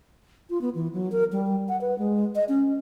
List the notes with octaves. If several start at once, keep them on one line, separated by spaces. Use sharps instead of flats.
F4
B3
E3
F#3
A#4
G3
F#5
B4
G#3
D#5
C#4